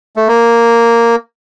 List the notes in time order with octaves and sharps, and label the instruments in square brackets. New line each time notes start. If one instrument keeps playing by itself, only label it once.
[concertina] A3
A#3